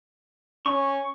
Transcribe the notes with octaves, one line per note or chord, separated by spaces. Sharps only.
C#4 C#6